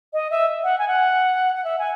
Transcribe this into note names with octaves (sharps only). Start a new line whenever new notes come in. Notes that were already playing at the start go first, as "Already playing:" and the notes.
D#5
E5
F#5
G#5
F#5
F#5
E5
G#5